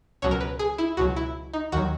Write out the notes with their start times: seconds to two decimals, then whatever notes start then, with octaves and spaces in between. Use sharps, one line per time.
0.22 C#2 B2 F#3 C#5
0.31 A#4
0.41 B4
0.59 G#4
0.78 E4
0.97 C#2 B2 F#3 F#4
1.16 E4
1.54 D#4
1.72 D#2 D#3 F#3 F#4